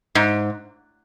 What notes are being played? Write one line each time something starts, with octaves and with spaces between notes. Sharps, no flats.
G#2